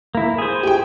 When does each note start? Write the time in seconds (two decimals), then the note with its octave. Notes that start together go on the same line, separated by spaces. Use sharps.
0.15 A#3 E4
0.38 G#4 C5
0.63 G4 G5